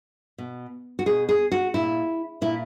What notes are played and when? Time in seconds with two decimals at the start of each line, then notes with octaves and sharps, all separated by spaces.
0.38 B2
0.99 F#4
1.06 B2 G#4
1.29 G#4
1.52 F#4
1.74 A#2 E4
2.41 A#2 E4